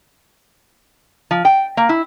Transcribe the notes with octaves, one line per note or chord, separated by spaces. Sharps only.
F3
G5
A#3
E4